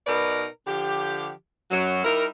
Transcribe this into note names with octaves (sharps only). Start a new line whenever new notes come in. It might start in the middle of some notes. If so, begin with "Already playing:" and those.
B2 D#4 A#4 B4 D5
D3 F3 G4
F#2 F#3
G3 D#4 E4 A#4